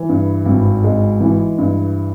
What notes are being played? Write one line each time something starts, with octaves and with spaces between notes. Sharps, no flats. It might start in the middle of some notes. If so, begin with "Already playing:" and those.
Already playing: E3
G2
G#1
G#3
E3
G2